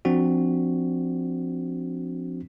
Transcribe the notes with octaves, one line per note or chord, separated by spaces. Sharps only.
F3 C4 D4 F#4